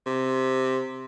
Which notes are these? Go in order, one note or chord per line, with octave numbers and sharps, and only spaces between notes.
C3